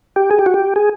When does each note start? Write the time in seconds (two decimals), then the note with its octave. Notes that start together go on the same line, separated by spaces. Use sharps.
0.16 G4
0.31 G#4
0.39 G4
0.46 F#4
0.54 G4
0.76 G#4